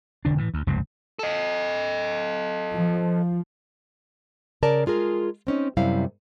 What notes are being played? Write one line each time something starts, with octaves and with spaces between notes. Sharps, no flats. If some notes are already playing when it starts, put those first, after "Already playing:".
E1 D3 D4
A2 E3
D2
F1 C#2 G2 C3
A4 D#5
F3
C#3 A#4 D5 A5
G#3 F4 G#4 A#4
C4 C#4 D#4
F#2 C3 G3 E4 F5